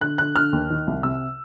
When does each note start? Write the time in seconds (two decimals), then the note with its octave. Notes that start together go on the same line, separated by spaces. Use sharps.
0.01 D3 F#6
0.18 D3 F#6
0.36 D3 F6
0.53 D#2
0.70 D#3
0.87 C2
1.03 C3 E6